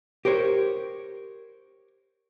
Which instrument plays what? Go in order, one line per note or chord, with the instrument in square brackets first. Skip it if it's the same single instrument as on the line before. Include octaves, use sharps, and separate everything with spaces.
[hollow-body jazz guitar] G4 A#4 C5 C#5